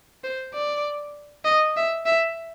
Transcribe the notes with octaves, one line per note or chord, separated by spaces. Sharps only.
C5
D5
D#5
E5
E5